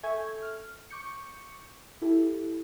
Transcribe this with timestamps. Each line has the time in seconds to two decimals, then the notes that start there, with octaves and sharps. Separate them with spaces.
0.03 A4 E5 G#5 C#6 G6 G#6
0.42 F6
0.90 C#6 D6 G6 C#7
2.02 E4 G4 A4